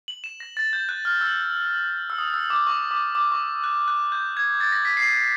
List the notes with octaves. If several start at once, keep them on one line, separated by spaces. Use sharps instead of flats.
F#7
E7
A#6
A6
G6
F#6
F6
E6
E6
D#6
E6
D6
C#6
D6
D6
C#6
F#6
F#6
G6
G#6
A6
A#6
B6
C7